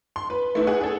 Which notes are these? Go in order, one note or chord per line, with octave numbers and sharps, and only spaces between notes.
C6
B4
A3 B3 E4
G#4 F#5
G#4 A4